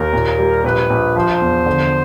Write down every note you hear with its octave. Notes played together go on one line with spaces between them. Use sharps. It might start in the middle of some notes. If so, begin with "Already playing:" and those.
Already playing: D#2 A#4
A#2
G3
A#1 B4
A#1
F3 C5
E2
D3